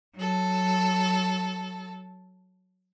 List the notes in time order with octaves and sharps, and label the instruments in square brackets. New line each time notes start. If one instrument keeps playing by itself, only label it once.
[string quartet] F#3 A4